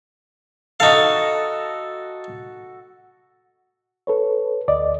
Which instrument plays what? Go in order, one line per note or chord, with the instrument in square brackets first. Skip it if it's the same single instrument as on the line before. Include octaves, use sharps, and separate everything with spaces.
[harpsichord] D#4 F5 [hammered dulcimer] F#4 A4
[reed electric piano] A4 B4 C#5
D2 D5 D#5